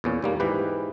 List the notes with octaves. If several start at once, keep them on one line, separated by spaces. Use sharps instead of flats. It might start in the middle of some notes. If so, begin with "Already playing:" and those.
E2 A#2 C#4
D#2 G3 A#3
G#2 E3 G4 B4